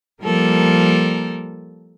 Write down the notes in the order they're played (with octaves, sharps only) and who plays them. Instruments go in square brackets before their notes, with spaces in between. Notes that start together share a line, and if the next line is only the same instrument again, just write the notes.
[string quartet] F3 G3 A#3 A4 A#4